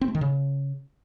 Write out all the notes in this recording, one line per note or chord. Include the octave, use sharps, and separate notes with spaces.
C4
A3
D#3
C#3